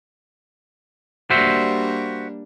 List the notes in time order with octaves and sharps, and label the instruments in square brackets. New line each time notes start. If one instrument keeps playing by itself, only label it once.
[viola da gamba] G3 A#3 D4 [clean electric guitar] F#4 C5 E5